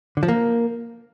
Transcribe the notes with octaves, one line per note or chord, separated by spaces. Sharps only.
D3
F3
A#3